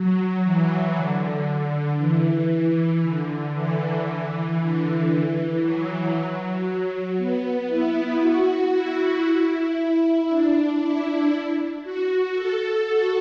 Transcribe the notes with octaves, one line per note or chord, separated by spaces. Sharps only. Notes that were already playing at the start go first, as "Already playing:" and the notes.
Already playing: F#3
E3
D3
E3
E3
D3
E3
D3
E3
F#3
F#3
B3
E4
F#4
E4
D4
E4
F#4
A4
F#4